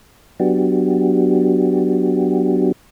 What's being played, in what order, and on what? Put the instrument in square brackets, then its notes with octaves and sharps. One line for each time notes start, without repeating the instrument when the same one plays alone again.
[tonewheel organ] F#3 B3 D4 F#4 G4